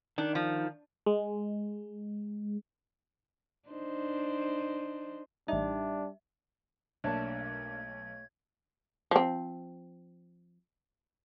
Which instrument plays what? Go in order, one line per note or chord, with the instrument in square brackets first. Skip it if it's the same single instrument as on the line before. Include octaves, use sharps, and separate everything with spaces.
[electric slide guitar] D#3 [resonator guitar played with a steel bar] D4
[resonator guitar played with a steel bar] F3
[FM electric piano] G#3
[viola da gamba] D4 D#4 C5
[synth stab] A1 D#4 [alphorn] G3 [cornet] D4 [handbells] E5
[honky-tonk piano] B1 [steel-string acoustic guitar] A3 C#5 A5 [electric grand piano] A#3 D4 [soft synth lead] G#6
[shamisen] F3 C4